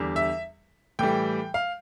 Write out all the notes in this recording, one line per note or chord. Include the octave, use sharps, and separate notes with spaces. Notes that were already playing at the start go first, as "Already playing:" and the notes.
Already playing: E2 D3 G3
E5
A2 E3 G3 G5
F5